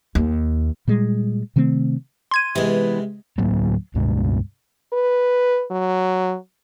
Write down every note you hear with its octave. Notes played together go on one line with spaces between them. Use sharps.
D#2
A#2 G3 G#3
C3 D#3 A3 C4
C6 G#6 D#7
C3 E3 G#3 B3
D2 A2 F#3 A#3
C#2 G2 B2 G#3
B4
F#3